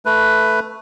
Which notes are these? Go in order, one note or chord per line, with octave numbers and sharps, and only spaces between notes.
A3 B4